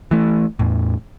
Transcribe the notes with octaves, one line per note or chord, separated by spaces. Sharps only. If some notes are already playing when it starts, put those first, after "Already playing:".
E3 A3
E2 A2